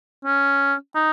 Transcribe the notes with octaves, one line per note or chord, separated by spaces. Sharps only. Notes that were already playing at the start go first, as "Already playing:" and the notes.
C#4
D#4